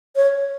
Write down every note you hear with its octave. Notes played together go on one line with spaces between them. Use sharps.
C#5